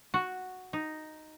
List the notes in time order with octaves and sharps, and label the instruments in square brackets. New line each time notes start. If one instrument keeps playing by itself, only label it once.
[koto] F#4
D#4